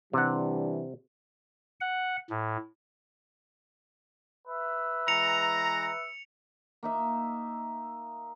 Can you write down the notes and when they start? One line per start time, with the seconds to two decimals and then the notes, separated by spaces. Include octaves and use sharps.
0.13 C3 E3 G3 D4 F#5
1.81 F#5
2.30 A2
4.47 B4 E5
5.08 E3 G#3 A#5 C#7 F7
6.83 A#3 D#4 E5